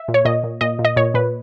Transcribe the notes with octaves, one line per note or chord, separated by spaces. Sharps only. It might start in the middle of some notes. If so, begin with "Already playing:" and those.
Already playing: E5
A#2
C#5
A#2 D#5
A#2
A#2 D#5
A#2
D#5
A#2 C#5
A#2 B4